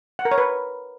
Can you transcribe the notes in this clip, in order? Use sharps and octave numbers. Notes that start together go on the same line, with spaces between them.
F#5
A#4
C#5
B4